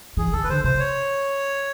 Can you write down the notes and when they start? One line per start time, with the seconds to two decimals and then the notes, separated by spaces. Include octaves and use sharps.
0.17 E3 G#4
0.33 D#3 A4
0.44 B4
0.49 D3 C5
0.64 C3 C5
0.79 C#5